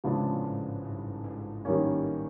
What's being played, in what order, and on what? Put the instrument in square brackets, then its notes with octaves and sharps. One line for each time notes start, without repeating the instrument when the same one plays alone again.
[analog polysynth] A1 A2 [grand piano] C#3 F3 G#3 B3 D4
[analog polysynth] G#2
G2
G#2
[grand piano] D#3 G3 A#3 C#4